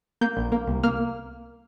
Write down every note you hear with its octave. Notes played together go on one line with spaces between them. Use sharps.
A#3 G6
A#1
A#3
C2
A#3 F6